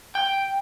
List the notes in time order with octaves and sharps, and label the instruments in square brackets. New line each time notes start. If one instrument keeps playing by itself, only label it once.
[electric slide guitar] G5